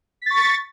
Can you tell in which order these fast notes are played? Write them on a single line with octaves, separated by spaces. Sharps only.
B6 A6 C#6